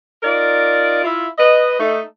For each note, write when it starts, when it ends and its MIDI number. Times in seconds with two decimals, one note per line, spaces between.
0.23 1.02 63
0.23 1.02 65
0.23 1.02 70
0.23 1.02 74
1.04 1.26 64
1.04 1.26 65
1.39 1.79 71
1.39 1.79 75
1.80 2.01 57
1.80 2.01 63